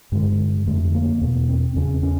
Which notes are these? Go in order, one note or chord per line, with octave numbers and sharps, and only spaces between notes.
G2 D3 G#3
F2 D3 A3
A#3
E2 B2 B3
C4
E2 C#3 C#4
C#4